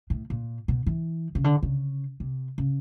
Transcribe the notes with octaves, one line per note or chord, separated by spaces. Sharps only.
A2
A#2
B2
E3
C#3
D3
C#3
C3
C#3